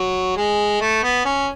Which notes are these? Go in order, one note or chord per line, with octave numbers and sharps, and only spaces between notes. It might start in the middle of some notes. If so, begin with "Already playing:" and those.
Already playing: F#3
G#3
A3
B3
C#4